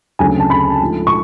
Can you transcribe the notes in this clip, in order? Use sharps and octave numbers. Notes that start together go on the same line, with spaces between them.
D2 C#3 F#3 A3 C4 G#5
A5
B5
G#2 F3 A3
C#6